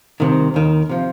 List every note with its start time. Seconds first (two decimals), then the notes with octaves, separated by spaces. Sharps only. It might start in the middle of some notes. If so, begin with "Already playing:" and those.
0.20 C2 C3 D#3
0.54 D#2 D#3
0.89 C3 F3